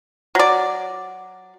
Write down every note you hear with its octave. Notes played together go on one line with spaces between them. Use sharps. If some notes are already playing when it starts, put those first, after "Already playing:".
F#3 D5